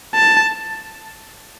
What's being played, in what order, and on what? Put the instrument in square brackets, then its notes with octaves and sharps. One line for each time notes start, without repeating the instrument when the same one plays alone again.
[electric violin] A5